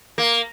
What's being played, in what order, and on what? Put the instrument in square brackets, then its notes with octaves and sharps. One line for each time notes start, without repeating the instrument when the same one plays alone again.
[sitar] A#3